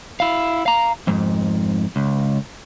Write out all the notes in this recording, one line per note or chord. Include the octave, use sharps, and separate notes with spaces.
E4 F5
F5 A#5
F2 G#2
C#2